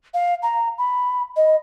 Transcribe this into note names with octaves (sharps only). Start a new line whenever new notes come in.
F5
A#5
B5
D#5